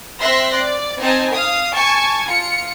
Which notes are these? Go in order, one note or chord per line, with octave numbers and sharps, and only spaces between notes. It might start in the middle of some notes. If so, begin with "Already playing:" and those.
C4 E5 C6 F#6 A#6
D5
C4 D#4 D#5 G#5 A5
F5 D#6
G#5 A5 C#6
F4 C#7